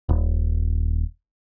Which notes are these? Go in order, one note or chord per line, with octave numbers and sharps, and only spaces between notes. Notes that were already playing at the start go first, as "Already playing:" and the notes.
D#1